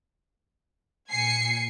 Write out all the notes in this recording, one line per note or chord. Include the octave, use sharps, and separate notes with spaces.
A#2 G#5 C7 C#7